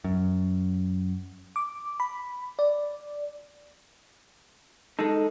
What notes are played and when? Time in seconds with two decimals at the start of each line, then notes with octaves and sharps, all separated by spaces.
0.04 F#2
1.56 D6
2.00 B5
2.59 D5
4.99 G#3 D#4 A4